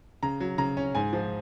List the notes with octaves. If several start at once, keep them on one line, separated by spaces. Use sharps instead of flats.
C#3 A#5
F#3
C#3 A#5
C#4
G#2 G#5
F3